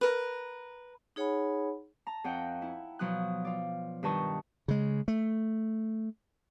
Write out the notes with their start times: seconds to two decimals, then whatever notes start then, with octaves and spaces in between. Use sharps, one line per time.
0.01 A#4 B4
1.16 D#4 G#4 C#5 F#5 G#5 B5
2.07 A5 A#5
2.24 F2 D#5 F#5 G5
2.62 E4
2.99 B2 F3 F#3 B3 D#6 F#6
3.45 F4 D5
4.03 G2 D#3 B4 D#5 A5 C#6
4.68 C#3 G#3
5.08 A3